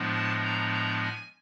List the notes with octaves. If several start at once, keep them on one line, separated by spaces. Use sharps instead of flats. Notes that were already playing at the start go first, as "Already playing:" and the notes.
Already playing: A2 F3 G#3 B3 D4
A5
A#5
A#5
G#5